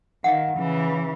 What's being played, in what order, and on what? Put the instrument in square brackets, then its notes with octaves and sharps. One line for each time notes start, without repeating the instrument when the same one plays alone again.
[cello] D#3 [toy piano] F5 F#5
[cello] C#3 E3